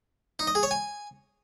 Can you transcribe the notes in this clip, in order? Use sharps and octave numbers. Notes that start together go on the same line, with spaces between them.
D#4
D#5
G#4
C#5
G#5